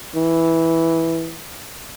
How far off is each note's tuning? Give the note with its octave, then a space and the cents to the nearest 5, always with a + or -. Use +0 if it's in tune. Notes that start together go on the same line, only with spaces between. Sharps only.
E3 -5